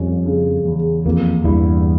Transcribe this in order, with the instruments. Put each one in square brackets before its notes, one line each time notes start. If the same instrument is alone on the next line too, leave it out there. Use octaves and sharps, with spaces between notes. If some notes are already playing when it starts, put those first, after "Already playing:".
Already playing: [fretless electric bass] F2 [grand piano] G3 C#4
[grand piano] C#3
E2
[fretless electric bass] F2 [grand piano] A#3
[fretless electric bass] E2 G2 [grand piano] E4